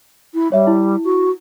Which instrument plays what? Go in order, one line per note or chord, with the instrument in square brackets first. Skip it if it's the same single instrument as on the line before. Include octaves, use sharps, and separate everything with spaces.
[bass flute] E4
[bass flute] G3 [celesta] C#5 E5
[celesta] E4
[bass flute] F#4